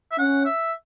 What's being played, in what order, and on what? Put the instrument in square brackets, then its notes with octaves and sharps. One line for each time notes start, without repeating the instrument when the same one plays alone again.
[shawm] E5
[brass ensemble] C#4 [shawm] F#5
[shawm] E5